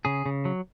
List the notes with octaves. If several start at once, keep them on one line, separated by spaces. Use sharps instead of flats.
C#3 G#4
C#3
F#3